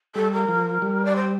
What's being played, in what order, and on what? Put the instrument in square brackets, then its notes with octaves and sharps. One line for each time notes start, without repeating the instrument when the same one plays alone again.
[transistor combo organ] G3 [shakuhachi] A4
[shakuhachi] A#4
[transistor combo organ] F3
G3
[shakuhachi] D5
C5